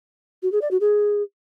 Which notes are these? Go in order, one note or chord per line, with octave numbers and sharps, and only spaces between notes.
F#4
G#4
D5
F#4
G#4